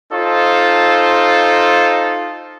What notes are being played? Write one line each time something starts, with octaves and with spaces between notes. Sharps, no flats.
D#4 F4 A4 C5